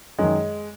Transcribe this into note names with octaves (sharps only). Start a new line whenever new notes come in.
F#2 D#3 G#3